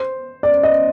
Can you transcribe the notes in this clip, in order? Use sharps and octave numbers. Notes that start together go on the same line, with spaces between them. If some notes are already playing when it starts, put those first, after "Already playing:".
Already playing: C5
D5
D#5